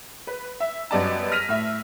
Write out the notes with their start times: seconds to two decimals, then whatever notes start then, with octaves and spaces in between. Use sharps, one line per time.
0.27 B4
0.60 E5
0.91 F#2 G3 B3 D5 D#5 A5
1.32 F6 A#6 B6 D#7 F7
1.49 A2 E5